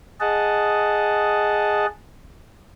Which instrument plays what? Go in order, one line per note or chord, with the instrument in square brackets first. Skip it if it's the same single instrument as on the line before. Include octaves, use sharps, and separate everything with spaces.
[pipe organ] G#4 D#5 F#5 A5